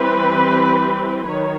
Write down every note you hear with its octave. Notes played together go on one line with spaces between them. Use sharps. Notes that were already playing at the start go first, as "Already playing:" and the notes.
Already playing: E3 G3 C4 B4
D#3 F#3 C#5